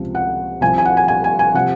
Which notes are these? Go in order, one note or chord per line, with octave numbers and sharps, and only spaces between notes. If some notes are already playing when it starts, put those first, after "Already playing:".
Already playing: C#2 C3 F3
F#5
C2 C3 F3 G#5
G#5
F#5
G#5
G#5
G#5
G#5
C3 F3 F#5